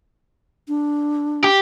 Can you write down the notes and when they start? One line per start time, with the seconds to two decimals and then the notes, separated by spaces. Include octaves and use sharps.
0.68 D4
1.44 G4